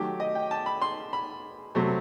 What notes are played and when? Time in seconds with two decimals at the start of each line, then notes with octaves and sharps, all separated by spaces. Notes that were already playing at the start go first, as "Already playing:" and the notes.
Already playing: D#3 F#3 A3 G4
0.20 D#5
0.35 G5
0.51 A5
0.66 B5
0.82 C6
1.13 B5
1.75 C3 F#3 A3